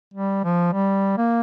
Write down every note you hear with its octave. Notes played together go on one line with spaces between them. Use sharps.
G3
F3
G3
A#3